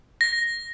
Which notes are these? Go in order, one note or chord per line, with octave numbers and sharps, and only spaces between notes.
A#6